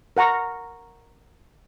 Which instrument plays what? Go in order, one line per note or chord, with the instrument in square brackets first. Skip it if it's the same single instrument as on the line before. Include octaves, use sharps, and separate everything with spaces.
[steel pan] A#4 F#5 A#5 C#6